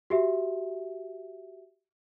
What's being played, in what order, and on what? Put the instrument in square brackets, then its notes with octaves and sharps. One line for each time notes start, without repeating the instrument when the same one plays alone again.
[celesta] F#4 G4 E5